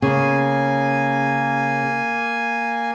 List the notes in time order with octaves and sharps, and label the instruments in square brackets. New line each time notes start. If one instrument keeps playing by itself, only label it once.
[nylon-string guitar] C#3 [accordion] A#3 G#5